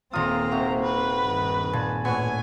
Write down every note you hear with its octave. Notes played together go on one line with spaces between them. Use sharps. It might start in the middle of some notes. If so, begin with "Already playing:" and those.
D#1 A#3 C4 F4 A#5 D#6
C3 F#4
B4
G2 D#3
A#2 G#5 A5
A2 A3 B3 F#4 C#5 G#5